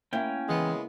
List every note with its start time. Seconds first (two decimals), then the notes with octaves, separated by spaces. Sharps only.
0.13 A#3 C#4 E4 G5
0.49 C#3 E3 G#3 B3